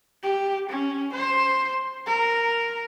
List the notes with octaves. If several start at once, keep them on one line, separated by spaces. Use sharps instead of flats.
G4
C#4
C5
A#4